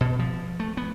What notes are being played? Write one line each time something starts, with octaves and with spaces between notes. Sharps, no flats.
B2
F3
A3
B3